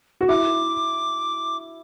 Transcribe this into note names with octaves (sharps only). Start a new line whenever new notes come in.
F#4
E4 D6